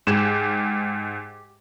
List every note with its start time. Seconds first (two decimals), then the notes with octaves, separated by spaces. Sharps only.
0.07 G#2 G4 G#4 E7